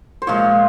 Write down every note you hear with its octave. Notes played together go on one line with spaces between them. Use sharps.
C5
A#2 F3 G#3 C#5